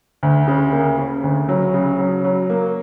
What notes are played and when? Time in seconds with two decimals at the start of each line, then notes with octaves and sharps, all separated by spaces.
0.23 D2
0.48 C#3
0.72 A#3
0.99 C#3
1.24 D2
1.49 F#3
1.74 C#3
1.99 F#3
2.24 F#3
2.50 A#3